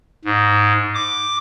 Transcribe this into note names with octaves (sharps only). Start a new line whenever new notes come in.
G#2
D6